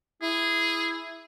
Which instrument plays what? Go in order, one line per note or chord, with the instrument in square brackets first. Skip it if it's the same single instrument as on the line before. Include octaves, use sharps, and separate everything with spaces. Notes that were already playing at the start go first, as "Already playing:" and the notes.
[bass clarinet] E4 [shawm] G#4